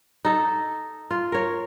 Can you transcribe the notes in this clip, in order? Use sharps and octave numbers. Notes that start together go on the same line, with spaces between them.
D#4 A4
F4
A#4 C#5